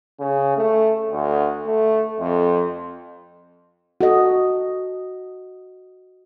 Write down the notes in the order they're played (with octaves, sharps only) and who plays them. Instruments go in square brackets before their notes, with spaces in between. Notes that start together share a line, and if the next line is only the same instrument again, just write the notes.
[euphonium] C#3
A3
D2
A3
F2
[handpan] F#4 A4 D#5